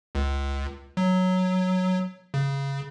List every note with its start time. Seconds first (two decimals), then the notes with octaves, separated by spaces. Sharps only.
0.15 C#2
0.97 F#3
2.34 C#3